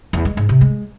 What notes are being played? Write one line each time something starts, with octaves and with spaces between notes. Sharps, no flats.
E2
G#3
G#2
C3
G#3